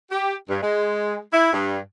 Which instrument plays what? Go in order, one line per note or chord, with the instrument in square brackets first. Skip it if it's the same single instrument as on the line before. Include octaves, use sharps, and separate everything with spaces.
[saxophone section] G4
G2
G#3
E4
G2